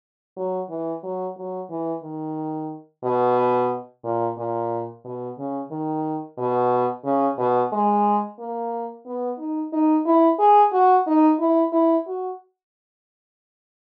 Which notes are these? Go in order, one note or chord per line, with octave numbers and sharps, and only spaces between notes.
F#3
E3
F#3
F#3
E3
D#3
B2
A#2
A#2
B2
C#3
D#3
B2
C#3
B2
G#3
A#3
B3
D#4
D#4
E4
G#4
F#4
D#4
E4
E4
F#4